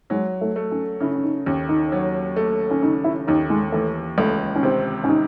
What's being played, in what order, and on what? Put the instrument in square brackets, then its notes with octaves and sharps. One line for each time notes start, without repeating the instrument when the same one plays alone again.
[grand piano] F#3 [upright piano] G#3
[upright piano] A3
[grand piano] A3
[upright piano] C#4
[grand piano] C#3 [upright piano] E4
[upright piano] C#4
D#4
[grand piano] D#2 [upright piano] C#4
[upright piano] D#4
[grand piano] F#3
A3
[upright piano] C#4
[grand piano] C#3 [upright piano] D#4
[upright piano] E4
[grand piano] D#2 [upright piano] D#4
[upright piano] G#3
[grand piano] E3 [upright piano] A3
[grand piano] C#2 [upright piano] A3
[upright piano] C#4
[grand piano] C3 [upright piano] C4
[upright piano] C#4
D#4